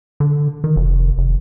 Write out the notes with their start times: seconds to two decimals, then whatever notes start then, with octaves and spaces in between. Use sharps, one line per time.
0.20 D3
0.64 D#3
0.76 F1
1.18 F1